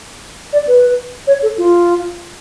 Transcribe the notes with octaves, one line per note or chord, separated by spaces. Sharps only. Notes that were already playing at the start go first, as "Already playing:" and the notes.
D5
B4
C#5
A4
F4